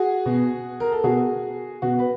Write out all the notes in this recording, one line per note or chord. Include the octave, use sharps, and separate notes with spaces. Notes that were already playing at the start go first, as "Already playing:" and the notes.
Already playing: F#4 G#4
B2
A#4
A4
B2 F#4 G#4
B2 F#4
B4